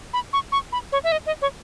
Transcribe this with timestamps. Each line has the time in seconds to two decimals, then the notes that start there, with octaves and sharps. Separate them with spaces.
0.13 B5
0.33 C#6
0.52 C#6
0.72 B5
0.92 C#5
1.04 E5
1.12 D#5
1.26 D#5
1.42 C#5